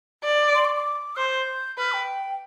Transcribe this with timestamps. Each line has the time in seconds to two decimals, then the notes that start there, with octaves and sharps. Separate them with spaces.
0.24 D5
0.55 C6
0.65 D6
0.76 D6
1.16 C5 G6
1.78 B4 F6
1.94 G5